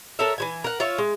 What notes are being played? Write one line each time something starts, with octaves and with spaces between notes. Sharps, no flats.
A4 A#4 C#5 E5
E3 F3 G#5
A#4 F#5
F4 C#5 E5
G#3